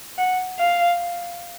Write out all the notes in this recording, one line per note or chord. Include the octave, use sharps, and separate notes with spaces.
F#5
F5